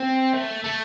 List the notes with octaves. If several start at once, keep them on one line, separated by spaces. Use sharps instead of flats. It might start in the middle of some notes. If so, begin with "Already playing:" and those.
Already playing: C4
A3
A3